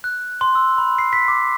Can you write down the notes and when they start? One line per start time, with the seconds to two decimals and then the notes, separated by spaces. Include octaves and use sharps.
0.04 F#6
0.41 C6
0.55 E6
0.78 B5
0.99 C7
1.13 B6
1.28 D6